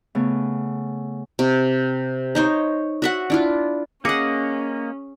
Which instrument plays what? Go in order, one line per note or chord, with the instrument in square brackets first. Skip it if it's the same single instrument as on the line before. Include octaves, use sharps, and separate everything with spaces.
[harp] C#3 A3 B3
[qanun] C3
D#4 C5 C#5
F#4 E5 F#5
D4 E4 F4
[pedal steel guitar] A#3 D#5 [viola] C#4 [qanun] G#4 F#5 [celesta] D6 A#6 C#7